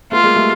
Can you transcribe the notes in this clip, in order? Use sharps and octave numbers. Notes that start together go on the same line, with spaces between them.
A3 B3 F4
G#3 A#3
G3 A3